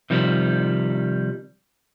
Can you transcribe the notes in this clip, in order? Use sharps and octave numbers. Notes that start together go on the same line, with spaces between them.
C3 D#3 F3 G3